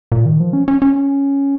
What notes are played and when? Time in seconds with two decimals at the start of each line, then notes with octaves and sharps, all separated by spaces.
0.12 A#2
0.25 D#3
0.40 F3
0.53 C#4
0.68 C#4
0.82 C#4